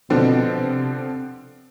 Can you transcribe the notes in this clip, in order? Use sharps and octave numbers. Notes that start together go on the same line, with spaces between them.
B2 D3 F3 C4
C3